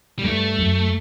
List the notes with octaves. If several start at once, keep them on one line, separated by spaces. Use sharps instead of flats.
G3
G2 A3
F#2